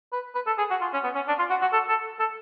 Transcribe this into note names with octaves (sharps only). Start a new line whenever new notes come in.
B4
B4
A4
G#4
F#4
F4
C#4
B3
C#4
D4
F4
F#4
F#4
A4
A4
A4